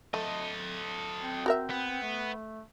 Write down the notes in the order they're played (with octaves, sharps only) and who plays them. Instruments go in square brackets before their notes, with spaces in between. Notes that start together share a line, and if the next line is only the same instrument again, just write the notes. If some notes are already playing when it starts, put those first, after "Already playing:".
[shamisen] A3 [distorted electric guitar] A4 D#5
[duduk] C4
[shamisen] F#4 A#4 E5
[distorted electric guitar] B3
[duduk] A3